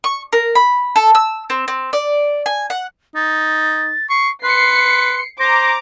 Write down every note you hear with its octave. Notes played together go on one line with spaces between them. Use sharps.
C#6
A#4
B5
A4
E6
C4
C4
D5
G#5
F#5
D#4 A6
C#6 C7
B4 C6 C7 C#7
C5 A#5 D6 A#6